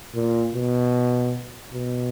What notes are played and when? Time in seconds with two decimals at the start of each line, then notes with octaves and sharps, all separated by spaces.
0.15 A#2
0.54 B2
1.73 B2